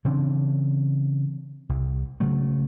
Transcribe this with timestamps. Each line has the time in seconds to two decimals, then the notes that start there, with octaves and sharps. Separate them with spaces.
0.05 C#3 E3 C4 D4
1.69 C2
2.20 C#3 F#3 A3